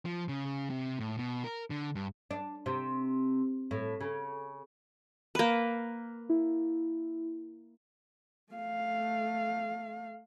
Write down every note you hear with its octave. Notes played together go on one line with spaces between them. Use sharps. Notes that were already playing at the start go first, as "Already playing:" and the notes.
F3
C#3
C3
A2
B2
A#4
D3
G2
D4
C3
A2
C#3
A#3 B4
E4
A3 F5